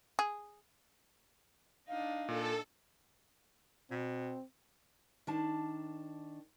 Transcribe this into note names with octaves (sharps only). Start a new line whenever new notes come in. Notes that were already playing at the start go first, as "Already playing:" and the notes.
G#4
D4 D#4 F5
A#2 A4
B2 C4
D#3 D4 A5